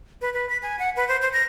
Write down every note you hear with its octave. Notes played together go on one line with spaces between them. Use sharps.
B4
B4
B6
G#5
F#5
B4
C5
C5
A#6